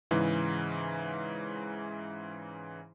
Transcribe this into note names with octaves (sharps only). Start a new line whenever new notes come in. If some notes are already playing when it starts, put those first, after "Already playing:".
G#2 C#3 E3